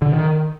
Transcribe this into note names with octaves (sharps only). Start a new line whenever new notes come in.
D3
D#3